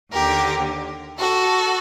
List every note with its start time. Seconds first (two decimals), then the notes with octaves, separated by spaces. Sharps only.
0.12 D#2 D3 G4 A#4
1.18 F#4 A4